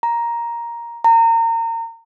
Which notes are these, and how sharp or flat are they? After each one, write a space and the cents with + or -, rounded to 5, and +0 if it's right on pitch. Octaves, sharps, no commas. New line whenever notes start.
A#5 +10
A#5 -30